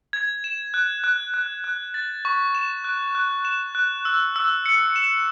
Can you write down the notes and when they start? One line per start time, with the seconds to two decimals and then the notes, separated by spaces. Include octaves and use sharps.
0.13 G#6
0.44 E7
0.74 F#6
1.04 F#6
1.34 F#6
1.64 F#6
1.94 A6
2.25 C#6
2.55 E7
2.84 F#6
3.15 F#6
3.45 E7
3.75 F#6
4.05 E6
4.36 E6
4.66 C#7
4.96 E7